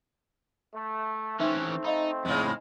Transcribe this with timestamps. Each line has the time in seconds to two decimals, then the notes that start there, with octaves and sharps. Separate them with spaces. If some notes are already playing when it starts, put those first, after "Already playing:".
0.75 A3
1.40 E3 A3 C4 C#4 D#4 C5 E5
1.85 D#4 D#5 F5 B5
2.25 F2 A2 C#3 G#3